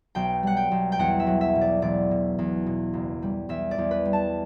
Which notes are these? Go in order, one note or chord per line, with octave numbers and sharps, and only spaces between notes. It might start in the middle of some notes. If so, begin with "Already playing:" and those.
B1 G5
G3 F#5
G5
B1
G5
E2 F#5
E5
F#3
E5
B2
D5
E1 D5
B2
E2
B2
F#1
G3
E2 E5
D5
E2
B4
G3
A5